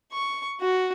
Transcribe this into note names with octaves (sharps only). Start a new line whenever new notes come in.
C#6
F#4